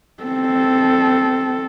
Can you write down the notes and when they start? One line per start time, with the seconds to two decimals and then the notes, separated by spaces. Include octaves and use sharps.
0.23 C4 A4